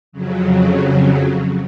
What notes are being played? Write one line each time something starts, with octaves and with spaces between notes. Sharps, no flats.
F2 C#3 F#3